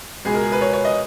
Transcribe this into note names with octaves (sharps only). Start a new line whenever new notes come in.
C#2 B2 G#3 G#4
A#4
G#4
B4
C#5
C#5
D#5